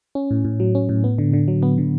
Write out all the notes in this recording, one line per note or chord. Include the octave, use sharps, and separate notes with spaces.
C#4
A2
A2
F#3
C#4
A2
B3
D3
D3
F#3
B3
D3